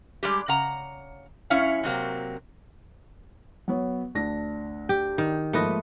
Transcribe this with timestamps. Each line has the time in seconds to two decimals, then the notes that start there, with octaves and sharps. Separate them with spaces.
0.23 G3 G#3 G4
0.48 C#3 F#5 A#5
1.50 F#2 C#4 E4 C#5 F5
1.83 C3 F#3 A#3 C4
3.68 F#3 B3 C#5
4.15 D2 D4 A#6
4.89 G4
5.18 D#3
5.53 G#2 F3 A3 A#3 B4 D#5